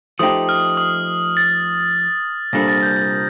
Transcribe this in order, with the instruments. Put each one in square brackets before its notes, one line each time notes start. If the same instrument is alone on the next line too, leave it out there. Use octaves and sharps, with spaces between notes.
[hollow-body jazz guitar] F3 A3 D#4 G4 [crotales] D#6
[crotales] F6
D#6
A6
[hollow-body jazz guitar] C2 A#2 G3 D4 A4 [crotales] A#6
[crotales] A6
G6
A6